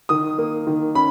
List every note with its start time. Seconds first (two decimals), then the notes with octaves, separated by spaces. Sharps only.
0.09 D#3 D#6
0.38 A#3
0.67 D#3
0.95 C#4 B5